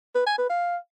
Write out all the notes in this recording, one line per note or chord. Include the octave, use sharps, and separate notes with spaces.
B4
G#5
B4
F5